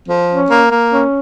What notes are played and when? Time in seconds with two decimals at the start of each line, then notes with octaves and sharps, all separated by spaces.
0.09 F3
0.30 C#4
0.50 A#3
0.71 A#3
0.92 C#4